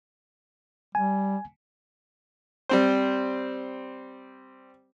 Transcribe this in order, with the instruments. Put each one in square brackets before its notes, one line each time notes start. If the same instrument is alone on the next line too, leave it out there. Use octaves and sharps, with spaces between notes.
[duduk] G3 [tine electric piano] G#5
[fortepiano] G3 C4 C5